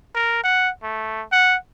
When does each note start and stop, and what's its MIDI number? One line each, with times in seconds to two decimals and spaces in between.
0.15 0.43 70
0.44 0.70 78
0.83 1.23 57
1.32 1.56 78